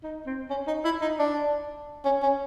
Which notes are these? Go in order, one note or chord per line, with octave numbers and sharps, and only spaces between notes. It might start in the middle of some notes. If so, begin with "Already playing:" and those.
D#4
C4
C#4
D#4
E4
D#4
D4
C#4
C#4